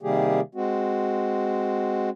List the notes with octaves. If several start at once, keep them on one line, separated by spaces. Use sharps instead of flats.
C3 D#3 G3 A#3 G4 G#4
G#3 C4 F#4